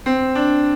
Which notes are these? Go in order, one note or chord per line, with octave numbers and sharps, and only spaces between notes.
C4
D4